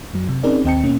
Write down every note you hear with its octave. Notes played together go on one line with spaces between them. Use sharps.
F#2 F#3
C3
C4 C#4 D#4 G#4 A#4 D5
D#2 C4 D#5 G5 A5 C#7
B2 A#3 C#4